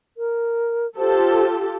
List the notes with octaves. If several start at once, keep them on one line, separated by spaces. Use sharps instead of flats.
A#4
F4 G4 A4 C5